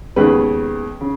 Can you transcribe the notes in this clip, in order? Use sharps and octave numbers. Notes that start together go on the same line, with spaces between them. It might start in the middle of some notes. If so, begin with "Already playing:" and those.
D#2 C#3 G#3 B3 B4
C#3